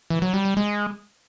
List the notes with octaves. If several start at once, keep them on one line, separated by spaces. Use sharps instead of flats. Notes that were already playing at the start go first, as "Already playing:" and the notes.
E3
F#3
G3
G3
G#3